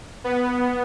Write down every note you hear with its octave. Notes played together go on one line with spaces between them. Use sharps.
B3